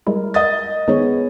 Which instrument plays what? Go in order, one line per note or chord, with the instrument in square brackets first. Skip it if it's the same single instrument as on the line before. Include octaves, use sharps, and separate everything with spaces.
[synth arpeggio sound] G3 G#3 E4 [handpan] A#4
[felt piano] D#5 D#6 A6
[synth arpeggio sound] D#3 G#3 D#4 [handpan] B3 G#4 C#5